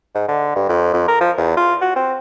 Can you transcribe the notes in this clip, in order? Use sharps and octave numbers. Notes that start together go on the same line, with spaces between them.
G#2
D3
G2
F2
F2
A#4
F3
E2
F4
F#4
C4